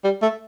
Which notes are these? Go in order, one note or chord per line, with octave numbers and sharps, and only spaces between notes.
G3
A3